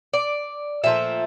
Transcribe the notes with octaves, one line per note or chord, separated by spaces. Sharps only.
D5
A#2 F3 A3 E5